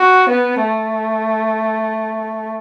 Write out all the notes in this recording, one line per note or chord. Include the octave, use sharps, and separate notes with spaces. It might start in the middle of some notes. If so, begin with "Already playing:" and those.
Already playing: F#4
B3
A3